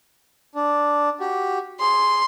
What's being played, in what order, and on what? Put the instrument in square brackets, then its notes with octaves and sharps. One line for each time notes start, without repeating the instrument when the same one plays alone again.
[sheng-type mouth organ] D4
F#4 G4
[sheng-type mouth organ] G#4 [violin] C6